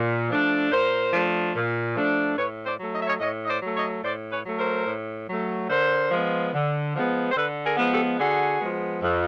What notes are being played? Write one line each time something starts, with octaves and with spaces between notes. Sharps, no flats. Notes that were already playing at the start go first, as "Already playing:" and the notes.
Already playing: A#2
F3 A3 D4
A#2 A#4 C5
F3 A3 D4
A#2
F3 A3 D4
A2 B4 C#5
C5 D5
F#3 A3
D#5
E5
C#5 D#5
A2 C#5 D#5
D#5
C5 D5
F#3 A3
C#5 D#5
A2 C5 D5
B4 C#5
F#3 A3
A#4 C5
A2
F#3 A3
D3 A#4 C5
F3 G#3 B3
D3
F3 G#3 B3
C5
D3 A4 B4
G#4 A#4
F3 G#3 B3
G4 A4
D3 F#4 G#4
F3 G#3 B3
F2